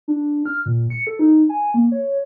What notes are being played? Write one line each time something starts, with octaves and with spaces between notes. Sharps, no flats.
D4
F6
A#2
C#7
A4
D#4
G#5
A#3
C#5